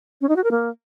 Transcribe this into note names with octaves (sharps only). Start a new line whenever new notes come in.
C#4
D#4
F#4
A#4
A#3